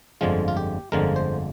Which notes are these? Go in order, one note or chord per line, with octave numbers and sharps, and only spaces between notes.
G1 F2 D3 F3 G#3 F4
F4
G4
G1 F2 D3 F3 G#3 A#4
C5